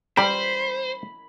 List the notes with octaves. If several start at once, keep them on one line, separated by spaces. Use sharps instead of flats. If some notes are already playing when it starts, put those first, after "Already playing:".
G3 C5 G5 B5